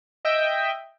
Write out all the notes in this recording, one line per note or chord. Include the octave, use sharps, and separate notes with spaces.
D#5 E5 G5